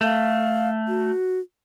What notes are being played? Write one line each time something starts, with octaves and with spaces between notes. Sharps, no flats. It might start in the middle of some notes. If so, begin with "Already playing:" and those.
A3 F5
F#4